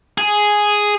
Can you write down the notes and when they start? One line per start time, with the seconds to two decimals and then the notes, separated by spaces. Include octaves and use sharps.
0.18 G#4